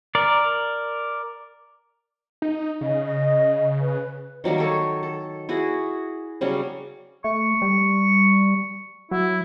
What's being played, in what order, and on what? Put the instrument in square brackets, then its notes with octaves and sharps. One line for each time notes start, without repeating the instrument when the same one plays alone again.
[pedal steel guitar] A#4 D5
[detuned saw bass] D#4
[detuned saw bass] C#3 [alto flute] D#5
[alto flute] D#5
B4
[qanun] D#3 F#3 G3 A#3
A4 C#5
A4
E4 F#4 G#4
C#3 F#3 G3 C#4
[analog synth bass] A3 [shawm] C#6
[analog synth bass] G3
[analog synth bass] F#3 [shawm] E4